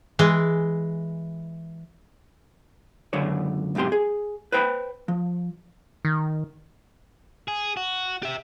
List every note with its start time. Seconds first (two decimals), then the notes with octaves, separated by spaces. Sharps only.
0.19 E3 G#3
3.13 C#2 F#2 D3 C#5
3.75 B1 G#2 C3 G4 C6
3.92 G#4
4.52 B4 C5 G5 A#5 B5
5.08 F3
6.05 D#3
7.48 G#4
7.77 F#4
8.23 G4 E5